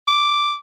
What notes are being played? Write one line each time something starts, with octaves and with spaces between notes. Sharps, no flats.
D6